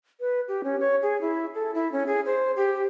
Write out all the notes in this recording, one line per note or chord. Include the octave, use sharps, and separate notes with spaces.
B4
G4
C#4
C#5
G#4
E4
A4
E4
C#4
G#4
C5
G4